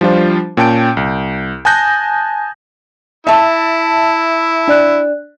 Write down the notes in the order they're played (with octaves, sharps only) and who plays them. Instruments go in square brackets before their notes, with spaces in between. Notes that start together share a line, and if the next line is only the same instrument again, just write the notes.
[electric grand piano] F3 G3 D4 F4 C5
A#2 C#4 G5 A5 G6 D7
C2
G#5 A5 D#6 F#6 G6 A#6
[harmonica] E4 [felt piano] E5 A5
[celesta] D4 D5 F#6